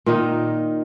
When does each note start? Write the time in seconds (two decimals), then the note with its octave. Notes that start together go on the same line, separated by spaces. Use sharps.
0.06 A#2 D#3 D#4